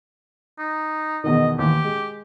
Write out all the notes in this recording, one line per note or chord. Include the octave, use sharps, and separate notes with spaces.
D#4
E2 B2 D#3 D#5
D#2 E3 G4
G#3